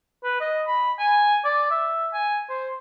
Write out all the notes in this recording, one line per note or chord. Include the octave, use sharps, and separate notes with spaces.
B4
D#5
B5
G#5
D5
E5
G#5
C5